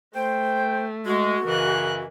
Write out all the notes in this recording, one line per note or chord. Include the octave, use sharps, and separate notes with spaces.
A3 C5 G5
G#3 F#4
F#2 C#3 E3 A#4 D#5 F#6